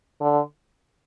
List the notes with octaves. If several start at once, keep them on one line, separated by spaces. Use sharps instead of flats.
D3